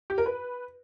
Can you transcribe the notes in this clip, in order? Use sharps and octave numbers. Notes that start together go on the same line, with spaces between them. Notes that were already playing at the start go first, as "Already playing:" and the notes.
G4
A#4
B4